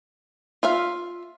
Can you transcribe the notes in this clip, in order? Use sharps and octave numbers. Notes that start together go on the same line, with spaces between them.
F4 E5 F5